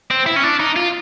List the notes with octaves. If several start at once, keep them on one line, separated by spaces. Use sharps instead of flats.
C4
E4
C#4
D4
D#4
F4